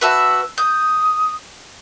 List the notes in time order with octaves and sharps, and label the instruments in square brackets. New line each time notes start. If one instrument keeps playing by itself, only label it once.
[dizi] F#4 [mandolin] B4 E5 A5
[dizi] D#6 [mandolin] G6